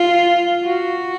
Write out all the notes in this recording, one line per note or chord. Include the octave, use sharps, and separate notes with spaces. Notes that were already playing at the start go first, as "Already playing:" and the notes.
Already playing: F4
F#4